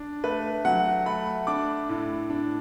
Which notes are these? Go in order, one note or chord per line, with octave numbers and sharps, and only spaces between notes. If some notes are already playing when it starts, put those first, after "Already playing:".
Already playing: D4
A3 B4
F#3 F#5
A3 B5
D4 D6
A2
D4